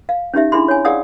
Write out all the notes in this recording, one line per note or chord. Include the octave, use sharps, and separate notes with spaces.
F5
C#4 D#4 G4 E5
D4 E4 G#4 B5 C6
C#5 G#5
G#4 D5 F5 F#5 D#6 E6